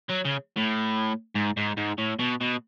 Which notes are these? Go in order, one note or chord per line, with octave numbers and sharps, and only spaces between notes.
F#3
C#3
A2
G#2
G#2
G#2
A2
B2
B2